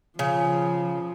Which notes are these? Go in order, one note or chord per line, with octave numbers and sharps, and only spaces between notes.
C#3 F3